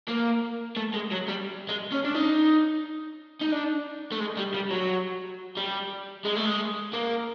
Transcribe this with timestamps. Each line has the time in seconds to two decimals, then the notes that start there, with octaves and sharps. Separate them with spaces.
0.08 A#3
0.77 A3
0.94 G#3
1.12 F#3
1.29 G3
1.69 G#3
1.92 C#4
2.05 D4
2.15 D#4
3.41 D#4
3.52 D4
4.12 A3
4.20 G#3
4.37 G3
4.54 G3
4.71 F#3
5.57 G3
6.25 G#3
6.36 A3
6.46 G#3
6.94 A#3